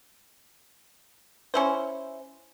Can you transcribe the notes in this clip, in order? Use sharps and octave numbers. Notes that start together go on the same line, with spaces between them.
C#4 E4 C5